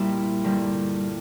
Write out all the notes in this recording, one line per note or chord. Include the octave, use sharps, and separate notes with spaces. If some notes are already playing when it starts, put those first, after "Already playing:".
Already playing: A#2 G3 A#3 E4 E5
G2 D3 G3 A#3